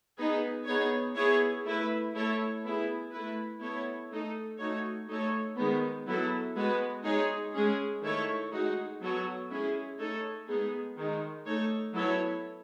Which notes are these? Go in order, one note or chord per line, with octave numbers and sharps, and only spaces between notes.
B3 D#4 G#4 B4
B3 D#4 G#4 C#5
B3 E4 G#4 C#5
A3 E4 B4
A3 E4 A4 C#5
B3 E4 G#4
A3 E4 B4
B3 E4 A4 C#5
A3 D#4 A4
A3 D#4 F#4 C#5
A3 D#4 A4 C#5
D#3 G#3 B3 D#4
F#3 B3 E4 A4
G#3 B3 F#4 B4
G#3 D#4 G#4 C#5
G#3 C#4 G#4
D#3 A3 E4 A4 C#5
G#3 D#4 F#4
F#3 B3 F#4 A4 C#5
G#3 C#4 E4 G#4
A3 D#4 A4 C#5
G#3 B3 D#4 G#4
D#3 G#3 D#4
A3 D#4 A4 C#5
F#3 B3 E4 A4 C#5